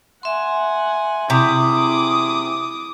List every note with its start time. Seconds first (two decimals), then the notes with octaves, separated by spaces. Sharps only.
0.23 E5 F#5 G#5 C6
1.30 C3 E4 G#4 D6 D#6